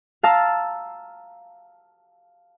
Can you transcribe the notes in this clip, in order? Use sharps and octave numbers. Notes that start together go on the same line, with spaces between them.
F5 A5 A#5 E6 F6